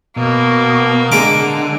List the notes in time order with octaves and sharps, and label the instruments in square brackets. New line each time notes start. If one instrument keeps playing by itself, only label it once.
[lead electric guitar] B2 [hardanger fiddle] A#3
[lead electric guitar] D3 [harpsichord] G#3 A#5 D6